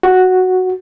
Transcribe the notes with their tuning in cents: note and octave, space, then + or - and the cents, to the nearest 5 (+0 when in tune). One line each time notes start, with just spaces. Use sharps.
F#4 +0